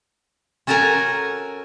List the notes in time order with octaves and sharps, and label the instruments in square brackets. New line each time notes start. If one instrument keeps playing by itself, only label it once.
[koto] C#4 F#4 A4 A#4 G#5 A#5